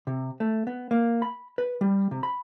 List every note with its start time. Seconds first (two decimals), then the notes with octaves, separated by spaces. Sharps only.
0.07 C3
0.40 A3
0.67 B3
0.91 A#3
1.22 B5
1.58 B4
1.81 G3
2.11 C3
2.23 B5